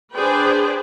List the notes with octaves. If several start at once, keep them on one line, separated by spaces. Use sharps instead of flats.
D4 G#4 B4 C5 D5 G5